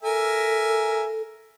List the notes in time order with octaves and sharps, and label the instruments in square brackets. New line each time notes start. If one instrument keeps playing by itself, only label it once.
[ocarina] A4 [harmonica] A#4 E5 G#5